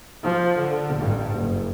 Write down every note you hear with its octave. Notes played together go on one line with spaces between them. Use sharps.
F3
D3
A1 G2
F#1